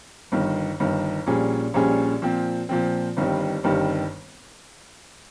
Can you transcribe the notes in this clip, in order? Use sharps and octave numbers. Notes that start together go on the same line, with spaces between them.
G1 G2 D#3
G1 G2 D#3
A#1 A#2 G3 C#4 G#4
A#1 A#2 G3 C#4 G#4
A#2 F3 C4
A#2 F3 C4
G1 G2 D#3 G3 C4
G1 G2 D#3 G3 C4